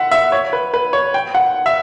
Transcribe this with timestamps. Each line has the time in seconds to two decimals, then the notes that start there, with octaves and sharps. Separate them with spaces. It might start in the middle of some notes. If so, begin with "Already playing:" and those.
Already playing: E5 F#5
0.11 E5
0.32 C#5
0.53 B4
0.74 B4
0.93 C#5
1.14 G5
1.35 F#5
1.66 E5